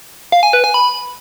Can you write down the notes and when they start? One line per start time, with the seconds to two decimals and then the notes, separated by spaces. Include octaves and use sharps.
0.32 F5
0.43 G#5
0.53 B4
0.64 G#5
0.74 B5